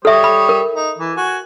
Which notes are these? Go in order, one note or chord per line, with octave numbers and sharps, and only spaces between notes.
G3 A4 C#5 E5 D#6
B5
A#4
D#4
E3
F#4 G#5